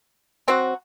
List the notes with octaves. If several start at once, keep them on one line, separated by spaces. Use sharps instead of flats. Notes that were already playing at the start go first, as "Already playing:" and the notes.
F#3 C4 F#4